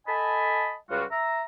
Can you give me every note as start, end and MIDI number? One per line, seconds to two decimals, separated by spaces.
0.07 0.74 69
0.07 0.74 75
0.07 0.74 80
0.07 0.74 81
0.07 0.74 83
0.90 1.04 37
0.90 1.04 55
0.90 1.04 65
0.90 1.04 66
1.11 1.44 76
1.11 1.44 82